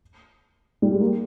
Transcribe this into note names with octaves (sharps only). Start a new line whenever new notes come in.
G3
G#3
A#3